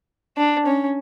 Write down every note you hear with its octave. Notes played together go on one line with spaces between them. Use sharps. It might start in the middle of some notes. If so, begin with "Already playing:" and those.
D4
C#4